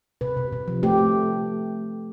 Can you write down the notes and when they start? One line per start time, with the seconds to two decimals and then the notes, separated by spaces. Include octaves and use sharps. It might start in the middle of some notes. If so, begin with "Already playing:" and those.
0.21 C3 B4
0.37 C3
0.52 C3
0.68 F3
0.83 A3 G4
0.98 A3